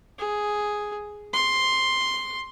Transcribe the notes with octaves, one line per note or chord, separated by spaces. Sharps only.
G#4
C6